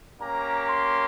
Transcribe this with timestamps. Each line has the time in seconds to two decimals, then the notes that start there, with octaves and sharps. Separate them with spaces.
0.22 A#3 C#4 G4 A#5
0.69 C6